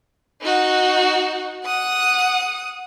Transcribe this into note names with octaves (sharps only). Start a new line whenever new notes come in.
D#4 F#4
F#5 D#6